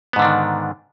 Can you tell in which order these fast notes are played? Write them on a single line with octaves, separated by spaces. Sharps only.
B3 G#2 D3 D4 D#3